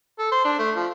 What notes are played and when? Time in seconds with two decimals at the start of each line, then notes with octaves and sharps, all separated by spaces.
0.19 A4
0.32 C5
0.45 D4
0.59 A3
0.76 F3